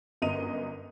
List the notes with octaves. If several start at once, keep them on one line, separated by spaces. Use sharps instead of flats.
G1 F#2 D#5 D#7 F7